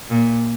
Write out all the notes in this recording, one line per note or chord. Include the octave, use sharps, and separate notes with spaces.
A#2